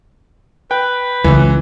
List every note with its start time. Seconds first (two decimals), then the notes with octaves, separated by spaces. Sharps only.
0.71 B4 G5
1.24 C#2 E3 C#4